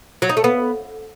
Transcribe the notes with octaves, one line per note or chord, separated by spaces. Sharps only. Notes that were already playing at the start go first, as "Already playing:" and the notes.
F#3
D#4
A3
B3